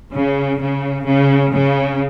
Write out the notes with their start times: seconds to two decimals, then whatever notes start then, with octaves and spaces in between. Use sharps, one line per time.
0.14 C#3
0.60 C#3
1.05 C#3
1.51 C#3